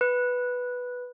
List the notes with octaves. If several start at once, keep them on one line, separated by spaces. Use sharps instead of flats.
B4